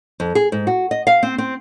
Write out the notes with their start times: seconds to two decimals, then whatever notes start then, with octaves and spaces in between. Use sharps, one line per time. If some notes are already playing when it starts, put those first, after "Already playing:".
0.20 F2
0.35 G#4
0.52 G#2
0.67 F#4
0.91 D#5
1.07 F5
1.23 C4
1.38 C4